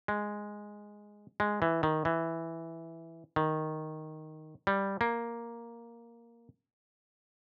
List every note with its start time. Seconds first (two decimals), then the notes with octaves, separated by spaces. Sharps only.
0.08 G#3
1.40 G#3
1.62 E3
1.83 D#3
2.05 E3
3.36 D#3
4.67 G3
5.01 A#3